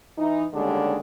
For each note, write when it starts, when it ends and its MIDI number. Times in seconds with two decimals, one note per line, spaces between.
0.18 0.44 52
0.18 0.44 63
0.54 0.97 39
0.54 0.97 50
0.54 0.97 55
0.54 0.97 56
0.54 0.97 61
0.54 0.97 62